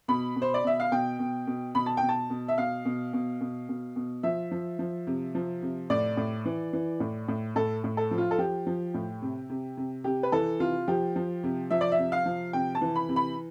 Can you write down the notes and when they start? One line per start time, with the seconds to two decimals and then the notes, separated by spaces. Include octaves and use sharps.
0.08 B2 B5
0.36 B2
0.42 C5
0.54 D5
0.64 B2 E5
0.80 F5
0.91 B2 G5
1.19 B2
1.47 B2
1.75 B2 B5
1.86 A5
1.97 G5
2.02 B2
2.09 A5
2.30 B2
2.48 E5
2.58 B2 F5
2.85 B2
3.13 B2
3.41 B2
3.69 B2
3.96 B2
4.23 F3 E5
4.51 F3
4.79 F3
5.07 C3
5.35 F3
5.62 C3
5.90 A2 D5
6.17 A2
6.45 E3
6.73 E3
7.00 A2
7.28 A2
7.56 A2 A4
7.84 A2
7.97 A4
8.11 F3
8.18 F4
8.31 A4
8.38 F3 G4
8.67 F3
8.94 A2
9.22 C3
9.50 C3
9.77 C3
10.04 C3 G4
10.23 B4
10.32 E3 A4
10.60 C3 F4
10.88 F3 G4
11.16 F3
11.44 C3
11.71 F3 E5
11.81 D5
11.92 E5
11.98 C3
12.12 F5
12.26 F3
12.53 C3 G5
12.75 A5
12.81 E3
12.95 B5
13.09 C3
13.16 B5